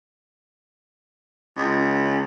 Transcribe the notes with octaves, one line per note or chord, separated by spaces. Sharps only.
C#2